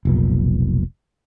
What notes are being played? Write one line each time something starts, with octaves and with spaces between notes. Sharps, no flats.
F1 B1 A#2